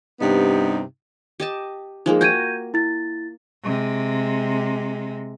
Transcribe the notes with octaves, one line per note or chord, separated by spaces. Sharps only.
G2 C3 B3 D#4
G4 D#5 A5
F3 G#3 A#3 D#4 G#4
F#4 G5 A#5 G6 G#6 D#7
E4 A6
C3 G#3